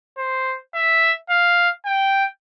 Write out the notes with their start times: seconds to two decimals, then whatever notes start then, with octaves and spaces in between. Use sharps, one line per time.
0.18 C5
0.74 E5
1.30 F5
1.86 G5